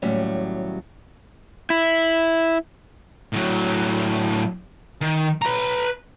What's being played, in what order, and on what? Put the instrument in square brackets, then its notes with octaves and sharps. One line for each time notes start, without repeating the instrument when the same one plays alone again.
[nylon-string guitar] D#2 A2 F#3 G3 C#4
[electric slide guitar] E4
[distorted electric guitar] A2 F#3
D#3
B4 A#5